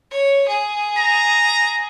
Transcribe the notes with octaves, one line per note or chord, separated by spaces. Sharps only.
C#5
G#4
A#5